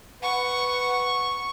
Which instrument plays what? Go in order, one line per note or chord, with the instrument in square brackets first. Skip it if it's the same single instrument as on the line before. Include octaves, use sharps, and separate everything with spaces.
[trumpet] B4 [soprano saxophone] F#5 [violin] C#6